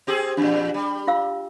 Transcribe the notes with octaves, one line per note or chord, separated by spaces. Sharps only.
C4 G4 G#4
E2 A#2 D4
G3
F4 F5 E6